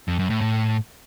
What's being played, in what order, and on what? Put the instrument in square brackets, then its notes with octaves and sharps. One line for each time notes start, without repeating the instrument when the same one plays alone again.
[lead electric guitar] F2
F#2
A2
A2